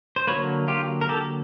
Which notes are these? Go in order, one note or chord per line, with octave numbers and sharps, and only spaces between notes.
C5
D3 F#3 A#3 B4 C#5
F4 G4
A#4
G4 A4